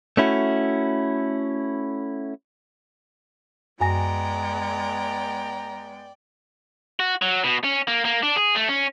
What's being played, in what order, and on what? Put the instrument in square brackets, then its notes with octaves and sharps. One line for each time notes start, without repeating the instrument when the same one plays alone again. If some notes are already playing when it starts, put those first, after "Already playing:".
[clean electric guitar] A3 C#4 E4 F#4
[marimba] F#2 G#5 A#6 [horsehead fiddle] G#3 B3 [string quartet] D5 G5 [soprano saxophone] A#5
[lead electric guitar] F#4
F#3
B2
C#4
A#3
A#3
D4
G#4
A3
C#4